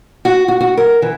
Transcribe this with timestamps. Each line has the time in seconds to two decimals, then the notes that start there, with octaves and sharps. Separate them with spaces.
0.25 F#4
0.48 F#4
0.61 F#4
0.77 A#4
1.02 E3